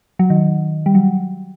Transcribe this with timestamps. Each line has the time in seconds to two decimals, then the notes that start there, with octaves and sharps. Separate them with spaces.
0.19 F#3
0.30 D#3
0.86 G3
0.95 F#3